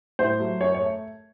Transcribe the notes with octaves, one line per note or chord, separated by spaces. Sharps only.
A2 C5
F#3 A3
F#2 C#5
C#5
A3